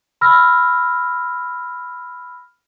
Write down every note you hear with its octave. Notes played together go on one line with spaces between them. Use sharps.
B5 E6 F6 A#6